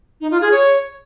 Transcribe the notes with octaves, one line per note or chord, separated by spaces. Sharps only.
D#4
F4
G#4
C#5